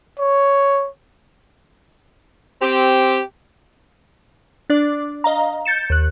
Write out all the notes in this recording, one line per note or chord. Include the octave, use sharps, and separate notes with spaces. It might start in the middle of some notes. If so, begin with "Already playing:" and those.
C#5
C4 G4
D4 D5 D6
D#5 F5 A#5
G6 A6 C#7 E7
D#2 F#6